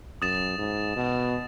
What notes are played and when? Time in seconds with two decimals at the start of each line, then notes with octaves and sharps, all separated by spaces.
0.22 F#2 D#6 A6 E7
0.58 G#2
0.96 B2